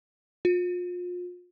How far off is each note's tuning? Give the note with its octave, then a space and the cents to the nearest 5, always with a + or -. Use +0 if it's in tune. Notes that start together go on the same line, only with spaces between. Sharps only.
F4 +35